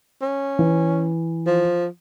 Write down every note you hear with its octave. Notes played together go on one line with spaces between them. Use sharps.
C#4
E3
F3